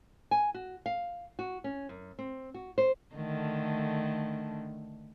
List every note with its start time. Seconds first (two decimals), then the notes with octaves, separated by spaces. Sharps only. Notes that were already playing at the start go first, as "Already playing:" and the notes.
0.31 G#5
0.54 F#4
0.86 F5
1.39 F#4
1.64 C#4
1.89 F#2
2.19 C4
2.54 F#4
2.78 C5
3.15 D3 D#3 A3